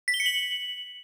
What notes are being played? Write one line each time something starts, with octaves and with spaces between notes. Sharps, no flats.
B6
G7
C#7
F#7